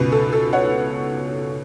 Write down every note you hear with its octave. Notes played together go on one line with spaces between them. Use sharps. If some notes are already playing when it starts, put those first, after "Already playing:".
Already playing: C#2 B2 B3 B4
A4
A4
C#5 F#5